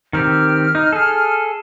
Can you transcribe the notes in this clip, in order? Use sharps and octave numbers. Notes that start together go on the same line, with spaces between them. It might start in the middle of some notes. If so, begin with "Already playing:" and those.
D#3 C4 G4 F6
D#4
G#4 A4